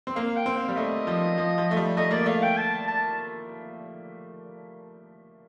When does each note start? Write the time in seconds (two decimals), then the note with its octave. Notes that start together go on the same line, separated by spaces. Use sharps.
0.07 C4
0.16 A#3 F5
0.37 G5
0.46 C4
0.57 F5
0.69 G3
0.76 A3 D#5
1.07 F3
1.38 F3
1.58 F3
1.71 A3
1.77 G3
1.97 A3 D#5
2.11 A#3 D5
2.26 A3 F5
2.43 G5
2.58 A5
2.88 A5